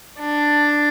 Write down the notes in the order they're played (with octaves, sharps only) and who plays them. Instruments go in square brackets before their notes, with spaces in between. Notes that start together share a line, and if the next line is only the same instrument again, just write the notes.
[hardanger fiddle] D4